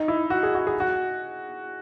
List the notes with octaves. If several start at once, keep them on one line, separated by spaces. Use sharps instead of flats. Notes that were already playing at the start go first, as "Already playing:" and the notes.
Already playing: D#4
E4
F#4
G#4
F#4
G#4
F#4